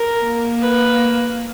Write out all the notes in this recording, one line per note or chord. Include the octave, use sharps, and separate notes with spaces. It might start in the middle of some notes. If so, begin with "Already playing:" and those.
Already playing: A#4
A#3
B4